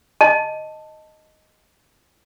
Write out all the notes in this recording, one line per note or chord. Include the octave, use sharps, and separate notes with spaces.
D#5 A5